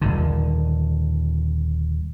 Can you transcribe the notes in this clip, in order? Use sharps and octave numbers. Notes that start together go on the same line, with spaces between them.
D#1 A#1 D3